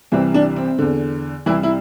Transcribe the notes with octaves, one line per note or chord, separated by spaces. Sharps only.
C2 C3 E3 C4
D4
C4
E2 D3
C2 C3 E3 E4
E4